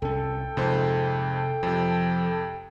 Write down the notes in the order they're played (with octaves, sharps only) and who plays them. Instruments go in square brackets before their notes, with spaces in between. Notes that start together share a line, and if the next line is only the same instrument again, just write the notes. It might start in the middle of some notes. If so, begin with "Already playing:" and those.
[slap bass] C2 C#4 [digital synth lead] A4 [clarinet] G5
[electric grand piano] F2 G#2 C5 [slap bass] C3
[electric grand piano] F2 C3 [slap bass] F3